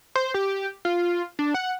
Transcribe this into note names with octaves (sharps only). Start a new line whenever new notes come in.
C5
G4
F4
D4
F#5